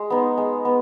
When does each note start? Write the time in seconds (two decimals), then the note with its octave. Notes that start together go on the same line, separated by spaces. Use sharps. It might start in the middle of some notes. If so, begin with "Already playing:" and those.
Already playing: G#3
0.10 B3 D#4
0.38 G#3
0.65 B3